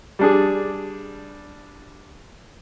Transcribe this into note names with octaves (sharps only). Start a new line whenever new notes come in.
G3 D4 G#4